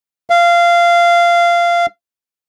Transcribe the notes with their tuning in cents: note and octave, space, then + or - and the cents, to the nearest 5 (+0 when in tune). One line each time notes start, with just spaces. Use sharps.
F5 -20